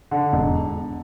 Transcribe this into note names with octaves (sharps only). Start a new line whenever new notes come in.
D3
E1